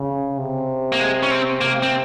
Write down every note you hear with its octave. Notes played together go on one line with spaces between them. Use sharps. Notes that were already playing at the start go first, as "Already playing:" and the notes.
Already playing: C#3
C3
A#3
G#3
C#4
C4
C3 A#3
C4